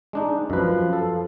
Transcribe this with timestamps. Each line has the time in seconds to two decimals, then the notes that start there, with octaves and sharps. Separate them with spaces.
0.13 G#3 D4 D#4
0.50 F#2 F3 B4
0.93 A4